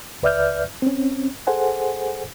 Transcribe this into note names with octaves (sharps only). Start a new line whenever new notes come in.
C#2 B4 D5 E5 F6 G6
C4 C#4
G#4 A4 C5 F#5 G#5